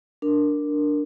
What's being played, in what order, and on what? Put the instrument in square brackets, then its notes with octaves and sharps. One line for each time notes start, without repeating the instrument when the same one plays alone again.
[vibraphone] D4 A#4